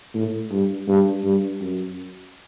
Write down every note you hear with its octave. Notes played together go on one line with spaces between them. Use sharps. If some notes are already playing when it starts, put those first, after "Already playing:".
A2
G2
G2
G2
F#2